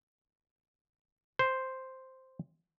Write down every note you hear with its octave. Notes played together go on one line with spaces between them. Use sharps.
C5